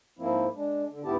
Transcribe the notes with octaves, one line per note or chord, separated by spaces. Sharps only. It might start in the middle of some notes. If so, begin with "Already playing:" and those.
G#2 F3 A#3 C4 E4
G#3 D4
D3
D2 G#2 B3 E4 G4 A5